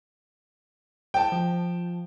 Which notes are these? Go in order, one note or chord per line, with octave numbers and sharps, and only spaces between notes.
G5 A5
F3